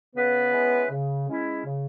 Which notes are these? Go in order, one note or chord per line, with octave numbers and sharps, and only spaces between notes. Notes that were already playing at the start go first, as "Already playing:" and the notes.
C#3 B3 B4
G#3 C#4 E4
C#3
G#3 C#4 E4
C#3